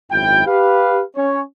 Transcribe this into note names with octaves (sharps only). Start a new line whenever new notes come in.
G#1 F#2 E4 G5
G4 B4 F5
C#4 C#5